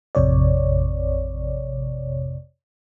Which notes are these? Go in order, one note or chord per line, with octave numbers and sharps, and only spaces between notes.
A1 F2 C3 C#5 D5